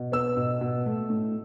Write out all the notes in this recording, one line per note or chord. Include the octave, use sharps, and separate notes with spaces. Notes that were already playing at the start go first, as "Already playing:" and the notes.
Already playing: B2
B3 E6
B2
B2
A3
A2